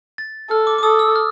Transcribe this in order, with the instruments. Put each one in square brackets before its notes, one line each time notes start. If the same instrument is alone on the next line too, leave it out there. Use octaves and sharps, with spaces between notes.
[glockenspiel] A6
[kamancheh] A4 [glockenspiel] F6
[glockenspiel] D6
D6
[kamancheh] A4 [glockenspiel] D#6
[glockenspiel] E6
F6